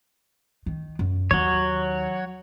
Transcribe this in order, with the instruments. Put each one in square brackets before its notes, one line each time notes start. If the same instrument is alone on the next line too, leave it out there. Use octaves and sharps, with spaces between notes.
[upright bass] D#3
F#2
[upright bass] D#2 D#3 [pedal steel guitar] F#3 C#5